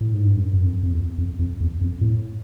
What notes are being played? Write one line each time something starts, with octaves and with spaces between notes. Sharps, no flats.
A2
G#2
G2
F#2
F#2
F2
F2
E2
F2
F2
E2
F2
A2